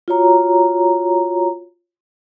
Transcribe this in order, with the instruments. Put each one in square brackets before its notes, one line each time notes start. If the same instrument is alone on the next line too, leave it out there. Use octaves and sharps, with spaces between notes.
[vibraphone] F4 F#4 C#5 A#5